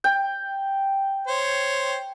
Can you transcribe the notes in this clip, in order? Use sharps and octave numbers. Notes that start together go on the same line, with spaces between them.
G5
C5 C#5